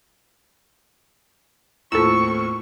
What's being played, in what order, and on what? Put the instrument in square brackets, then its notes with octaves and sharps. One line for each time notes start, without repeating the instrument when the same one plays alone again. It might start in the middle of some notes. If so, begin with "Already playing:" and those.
[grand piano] D#2 A2 C4 [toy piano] E4 F4 [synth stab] A4 E6 [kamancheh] C#6